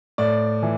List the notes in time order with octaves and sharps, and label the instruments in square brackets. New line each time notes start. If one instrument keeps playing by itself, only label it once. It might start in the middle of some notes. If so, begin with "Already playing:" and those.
[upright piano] A2 D5
E3